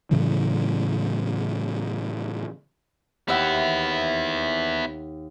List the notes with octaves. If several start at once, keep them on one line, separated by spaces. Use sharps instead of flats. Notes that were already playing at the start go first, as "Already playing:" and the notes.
A2 C#3 E3 F#3
D#2 B3 E4 E5 F#5